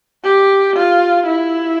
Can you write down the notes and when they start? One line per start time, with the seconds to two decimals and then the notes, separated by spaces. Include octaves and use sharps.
0.24 G4
0.76 F4
1.27 E4